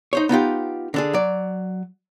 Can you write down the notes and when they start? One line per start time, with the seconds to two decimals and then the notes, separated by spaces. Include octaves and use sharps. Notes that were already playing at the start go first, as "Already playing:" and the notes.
0.13 D#4 C5 C#5
0.29 B3 D#4 F4 G4
0.94 D3 D4 G#4
1.13 F#3 D5